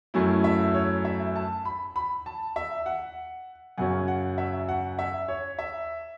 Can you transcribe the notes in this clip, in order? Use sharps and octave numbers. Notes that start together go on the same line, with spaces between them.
F#2 F#3 A3 C#4 E4
E5
C#5
E5
A5
B5
B5
A5
E5
F#5
F#2 C#3 F#3 C#4 F#5
F#5
E5
F#5
E5
C#5
E5